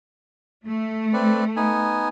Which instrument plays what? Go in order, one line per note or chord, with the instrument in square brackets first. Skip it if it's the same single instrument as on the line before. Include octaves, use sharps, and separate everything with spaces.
[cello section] A3
[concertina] C4 B4 D5
B3 D#4 G#5